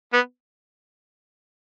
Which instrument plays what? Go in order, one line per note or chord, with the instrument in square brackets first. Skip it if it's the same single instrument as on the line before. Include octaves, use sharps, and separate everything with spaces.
[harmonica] B3